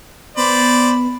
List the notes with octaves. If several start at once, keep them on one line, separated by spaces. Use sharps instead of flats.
B3 C5 D5 B5